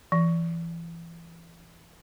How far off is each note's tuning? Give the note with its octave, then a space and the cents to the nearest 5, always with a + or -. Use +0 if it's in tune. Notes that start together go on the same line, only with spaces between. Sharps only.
E3 +25